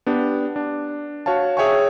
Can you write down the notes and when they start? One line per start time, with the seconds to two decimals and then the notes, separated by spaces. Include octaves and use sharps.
0.07 B3 D4 G4
0.56 D4
1.26 F#4 C#5 F5 A5
1.57 G#4 C#5 E5 G5 G#5 C#6